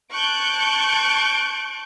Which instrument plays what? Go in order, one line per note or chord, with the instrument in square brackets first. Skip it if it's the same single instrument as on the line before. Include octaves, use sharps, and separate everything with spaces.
[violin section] A5 C#6 F#6 G6 D7